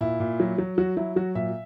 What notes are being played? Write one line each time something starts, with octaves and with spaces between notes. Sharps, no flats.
A#2 E4
A#2
F#3
F#3
F#3 F#4
F#3 E4
F#3 F#4
A#2 E5